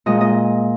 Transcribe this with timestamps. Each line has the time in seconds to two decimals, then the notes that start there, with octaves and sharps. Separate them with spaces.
0.06 A#2 G#3 D#5
0.21 D#5